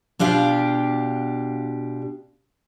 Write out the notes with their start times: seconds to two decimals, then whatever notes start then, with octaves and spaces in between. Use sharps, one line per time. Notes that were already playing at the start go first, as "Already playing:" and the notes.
0.19 B2 D4 F4 G4 F5